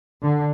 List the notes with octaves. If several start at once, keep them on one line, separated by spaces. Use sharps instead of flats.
D3